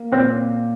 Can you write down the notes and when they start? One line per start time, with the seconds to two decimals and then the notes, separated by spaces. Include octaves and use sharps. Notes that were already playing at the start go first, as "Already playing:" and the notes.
Already playing: A#3
0.12 A#2 C4